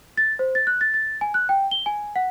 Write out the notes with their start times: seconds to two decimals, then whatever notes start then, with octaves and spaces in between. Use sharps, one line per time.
0.17 A6
0.39 C5
0.55 A6
0.67 F#6
0.81 A6
0.94 A6
1.21 G#5
1.34 F#6
1.49 G5
1.71 G7
1.86 G#5
2.16 F#5